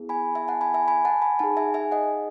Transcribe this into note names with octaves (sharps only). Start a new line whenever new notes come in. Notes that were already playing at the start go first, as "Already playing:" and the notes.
Already playing: B3 E4 G#4
G#5 B5
E5 G#5
F#5 A5
G#5 B5
E5 G#5
G#5 B5
F#5 A5
G#5 B5
D#4 G#4 F#5 A5
E5 G#5
E5 G#5
D#5 F#5